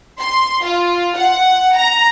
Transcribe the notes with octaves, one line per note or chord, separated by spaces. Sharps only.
C6
F4
F#5
A#5